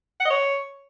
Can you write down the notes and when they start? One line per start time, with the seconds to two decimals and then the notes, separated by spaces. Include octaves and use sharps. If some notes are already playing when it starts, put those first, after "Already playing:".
0.20 F#5
0.25 D#5
0.30 C#5